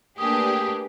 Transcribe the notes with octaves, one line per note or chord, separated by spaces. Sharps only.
A3 A#3 D4 G4 G#4 B4 D#6